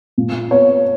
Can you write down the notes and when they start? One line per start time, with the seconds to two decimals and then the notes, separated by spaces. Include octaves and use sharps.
0.18 A#2
0.51 B3 C#5